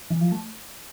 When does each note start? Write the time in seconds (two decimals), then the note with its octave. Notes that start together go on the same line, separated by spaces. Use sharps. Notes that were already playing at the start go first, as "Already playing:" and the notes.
0.10 E3
0.21 F3
0.32 A3